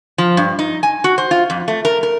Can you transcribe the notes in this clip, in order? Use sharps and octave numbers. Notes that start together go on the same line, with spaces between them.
F3
G2
D#4
G#5
F#4
C5
F4
F2
A3
A#4
A#4